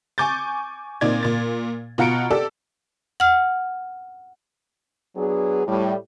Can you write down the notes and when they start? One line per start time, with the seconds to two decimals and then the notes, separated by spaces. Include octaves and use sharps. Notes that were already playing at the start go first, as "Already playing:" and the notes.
0.18 G#5 C#6 D6 G6 A6
1.01 A#2 C4 D#4 D5 G#6
1.23 A#2 A6
1.98 B2 F4 F#5 A#5 C#7 D7
2.31 G4 A4 D5 E6
3.20 F#5 F6
5.17 F#3 B3 D4 G#4
5.67 A2 G3